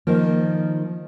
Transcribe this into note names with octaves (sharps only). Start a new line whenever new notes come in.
D#3 F3 A#3